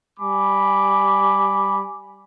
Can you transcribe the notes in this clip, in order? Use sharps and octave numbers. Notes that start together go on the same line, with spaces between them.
G3 G#5 B5 D6